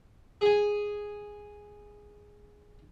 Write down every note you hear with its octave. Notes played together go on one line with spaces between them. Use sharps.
G#4 G#5